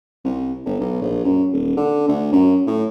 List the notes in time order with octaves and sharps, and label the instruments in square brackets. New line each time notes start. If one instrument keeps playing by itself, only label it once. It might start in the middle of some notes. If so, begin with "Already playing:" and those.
[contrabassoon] C2
G1
B1
A#1
F#2
D#1
D3
D2
F#2
A2